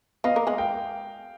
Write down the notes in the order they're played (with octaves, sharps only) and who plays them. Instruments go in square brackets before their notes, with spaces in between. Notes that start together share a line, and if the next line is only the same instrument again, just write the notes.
[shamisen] B3 B4 [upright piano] D#5 F5
[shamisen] A#3 A#4
G#3 G#4
[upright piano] F5 G5